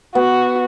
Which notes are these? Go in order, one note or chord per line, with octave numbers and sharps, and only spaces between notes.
B3 F#4